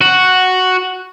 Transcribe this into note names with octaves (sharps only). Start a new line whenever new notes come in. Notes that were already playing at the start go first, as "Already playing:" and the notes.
F#4